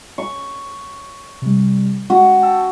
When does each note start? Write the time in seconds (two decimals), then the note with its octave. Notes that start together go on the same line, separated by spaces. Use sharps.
0.18 C#6
1.42 C3 G3
2.10 G#3 F#4
2.42 G5 A5 E6